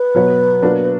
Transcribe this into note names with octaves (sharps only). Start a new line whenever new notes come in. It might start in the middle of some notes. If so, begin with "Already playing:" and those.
Already playing: B4
B2 F#3 B3 F#4 C#5
B2 F#3 A#3 D4 F#4